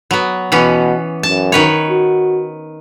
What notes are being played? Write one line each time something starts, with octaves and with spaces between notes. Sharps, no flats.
F#3 B3
B2 E3 B3 C#4
F#2 A5
D#3 B4 C#5
F#4